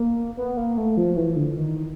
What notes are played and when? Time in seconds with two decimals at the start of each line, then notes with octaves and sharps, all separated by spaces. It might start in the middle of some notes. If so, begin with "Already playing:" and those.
Already playing: A#3
0.37 B3
0.57 A#3
0.77 A3
0.97 F3
1.17 E3
1.36 D3
1.57 D#3